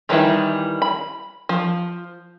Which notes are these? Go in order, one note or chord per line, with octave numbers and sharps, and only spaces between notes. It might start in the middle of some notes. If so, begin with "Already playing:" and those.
D#3 E3 G3 D#4 E4
B5
F3